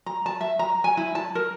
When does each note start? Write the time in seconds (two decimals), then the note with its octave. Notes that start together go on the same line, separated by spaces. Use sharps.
0.06 A#5
0.26 A5
0.41 E5
0.59 A#5
0.84 G#5
0.97 E4
1.15 A5
1.35 A#4